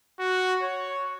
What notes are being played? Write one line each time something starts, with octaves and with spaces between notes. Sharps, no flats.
F#4
C#5